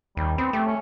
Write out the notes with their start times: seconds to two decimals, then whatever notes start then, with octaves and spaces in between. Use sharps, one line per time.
0.17 D#2 G3
0.38 B3 C4
0.53 A3 G4
0.66 C#4